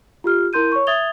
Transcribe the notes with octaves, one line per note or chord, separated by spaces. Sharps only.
F4 G4 F6
E4 A#4 C6 G6 D#7
C#5 C#6
E5 D#6 G#6 A6 F7 G7